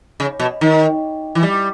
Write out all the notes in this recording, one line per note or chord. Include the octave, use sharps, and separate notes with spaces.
C#3
B2
D#3
E3
G3